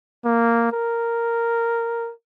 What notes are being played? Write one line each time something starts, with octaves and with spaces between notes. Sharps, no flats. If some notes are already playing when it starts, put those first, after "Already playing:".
A#3
A#4